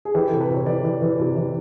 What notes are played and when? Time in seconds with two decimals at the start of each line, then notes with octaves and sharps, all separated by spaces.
0.05 G#4
0.14 E3 G4
0.27 C3 A4
0.41 B4
0.50 C3 C#5
0.66 E3 D5
0.85 E3
1.02 E3
1.19 C3
1.37 E3